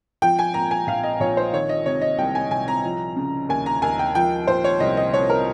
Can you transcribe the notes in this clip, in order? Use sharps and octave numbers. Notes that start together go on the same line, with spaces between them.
F3 G5
G#5
A#2 A#5
G#5
A#1 F5
D#5
A#1 C#5
C5
D#3 C#5
D#5
C3 C#5
D#5
C2 G5
G#5
C2 G#5
A#5
F3
C#3
D#2 G#5
A#5
D#2 G#5
G5
F3 G5
A#2 C5
C#5
C2 D#5
D#5
C2 C#5
A#4